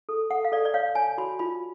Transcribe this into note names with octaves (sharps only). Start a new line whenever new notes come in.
A4
A4 F#5
F5
A4 D5
D5
C#5 F5
C#5 G#5
F#4 B5
F4 B5